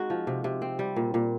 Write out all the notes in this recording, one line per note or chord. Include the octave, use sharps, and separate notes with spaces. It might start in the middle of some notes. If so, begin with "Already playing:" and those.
Already playing: G#3 C4 D#4 F#4
F3
C3
C3
C4
G3
A#2
A#2